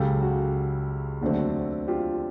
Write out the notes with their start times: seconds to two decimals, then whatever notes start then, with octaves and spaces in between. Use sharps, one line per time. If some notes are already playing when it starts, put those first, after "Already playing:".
Already playing: C#2 C#3 F#3 G4 A4
0.22 F#4
1.21 D#2 D3 F#3 A3 C4
1.87 F4 G4